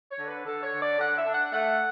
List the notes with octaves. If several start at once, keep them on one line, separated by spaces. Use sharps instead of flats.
C#5
D3
B4
D3 A4
C#5
D3
D5
D3 F#5
E5
D4
F#5
A3 F#5